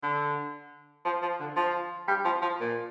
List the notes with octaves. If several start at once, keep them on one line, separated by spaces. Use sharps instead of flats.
D3
F3
F3
D3
F3
G3
F3
F3
A#2